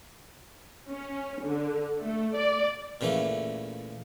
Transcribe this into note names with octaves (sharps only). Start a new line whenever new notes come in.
C#4
D3
A3
D5
A#2 C#3 E3 A3